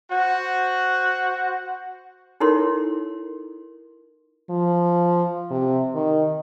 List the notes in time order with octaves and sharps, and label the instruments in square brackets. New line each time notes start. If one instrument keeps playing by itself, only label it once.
[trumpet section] F#4 C5 F#5
[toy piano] D#4 E4 A4 A#4 C#5 C6
[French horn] F3
C3
D#3